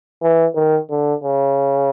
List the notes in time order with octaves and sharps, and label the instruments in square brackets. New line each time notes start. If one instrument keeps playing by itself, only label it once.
[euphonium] E3
D#3
D3
C#3